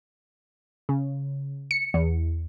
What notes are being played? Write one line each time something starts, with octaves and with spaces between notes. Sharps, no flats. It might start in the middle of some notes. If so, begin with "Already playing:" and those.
C#3
C#7
E2